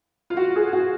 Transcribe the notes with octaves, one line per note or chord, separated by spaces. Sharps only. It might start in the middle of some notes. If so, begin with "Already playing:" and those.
F4
F#4
G#4
F#4